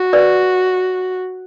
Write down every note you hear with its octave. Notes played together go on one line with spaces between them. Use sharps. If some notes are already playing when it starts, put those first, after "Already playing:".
Already playing: F#4
B4 D5